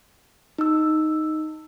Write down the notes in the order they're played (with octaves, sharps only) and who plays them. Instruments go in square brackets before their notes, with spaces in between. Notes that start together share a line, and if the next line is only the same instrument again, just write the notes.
[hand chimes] D#4 E6